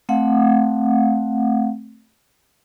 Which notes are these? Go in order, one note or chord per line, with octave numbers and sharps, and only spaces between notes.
A3 C4 F5 F#5